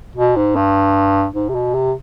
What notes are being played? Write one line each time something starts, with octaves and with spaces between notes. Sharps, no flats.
B2
G#2
G2
G#2
C3
B2
C3